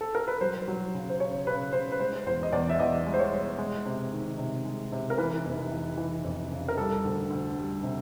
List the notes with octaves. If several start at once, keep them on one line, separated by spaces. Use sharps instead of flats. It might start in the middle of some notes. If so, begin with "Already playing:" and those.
A4
A#4
B4
F#3 C5
F#3
C#3
C5
C#3 C#5
C#3 B4
C#3 C5
B4
G#3 C5
E2 C5
D#5
E2 D5
E5
E2 D#5
G#3
C5
C#5
G#3
G#3
C3
D#3
C3
G#3
C3
A#4
E3 B4
F1
E3
E3
F2
C#3
A#4
G3 A4
D2
D2
G3
C3